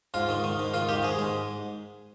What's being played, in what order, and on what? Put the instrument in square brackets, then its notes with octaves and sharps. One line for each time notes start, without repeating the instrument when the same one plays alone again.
[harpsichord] G#2 F4
D#3
D#3
G#2
D#3 F4
D#3 G4
G#2 G#4
G#2